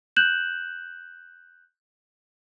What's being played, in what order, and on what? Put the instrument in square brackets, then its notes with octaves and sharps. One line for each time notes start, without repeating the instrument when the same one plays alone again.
[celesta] F#6 G6 E7 F#7